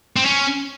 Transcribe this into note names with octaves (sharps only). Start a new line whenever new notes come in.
C4
C#4